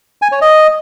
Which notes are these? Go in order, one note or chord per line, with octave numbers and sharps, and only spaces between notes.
G#5
C#5
D#5